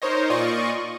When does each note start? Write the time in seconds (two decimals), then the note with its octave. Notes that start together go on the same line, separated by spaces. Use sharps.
0.02 D#4 A#4 C5 C#5 D#5
0.30 A#2 F4 D5 D#5 C#6 D#7